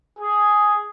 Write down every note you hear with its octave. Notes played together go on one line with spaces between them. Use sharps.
G#4